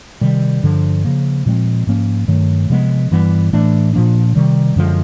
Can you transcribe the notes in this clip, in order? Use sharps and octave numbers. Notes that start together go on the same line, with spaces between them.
C3 D#3 G3
G2 D3 F3
C#3 F3 A#3
A#2 F3 G#3 C4
G#2 F3 A#3 C#4
G2 D#3 F#3 A3
C3 F3 G#3 B3
G2 E3 G3 B3
A2 E3 A3 D4
A#2 F3 A#3 D4
C3 D#3 G3
F#2 D3 F3 G#3